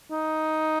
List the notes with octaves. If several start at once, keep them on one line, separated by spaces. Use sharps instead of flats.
D#4